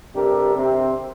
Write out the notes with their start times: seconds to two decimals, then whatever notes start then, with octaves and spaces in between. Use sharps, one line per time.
0.16 C3 G3 D4 G4 A4 A#4
0.56 C3 C4